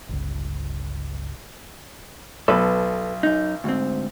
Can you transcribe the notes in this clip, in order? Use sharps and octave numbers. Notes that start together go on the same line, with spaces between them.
G1 C#2
B1 A4 B4
F#2 D#4
D2 G#2 C4